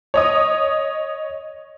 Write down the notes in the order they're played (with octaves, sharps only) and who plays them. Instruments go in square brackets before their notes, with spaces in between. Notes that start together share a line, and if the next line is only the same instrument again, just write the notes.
[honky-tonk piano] C#5 D#5 D#6